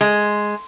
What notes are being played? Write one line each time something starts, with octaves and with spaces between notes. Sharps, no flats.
G#3